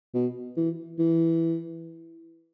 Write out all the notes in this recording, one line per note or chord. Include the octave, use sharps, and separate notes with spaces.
B2
E3
E3